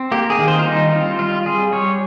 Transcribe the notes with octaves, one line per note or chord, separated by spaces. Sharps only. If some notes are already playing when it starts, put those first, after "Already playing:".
Already playing: C4
A#3 G4
G#4
D#3
C5
F4
G3 D#4
C4 F4
G3 F4
G3 G#4
G3 C#5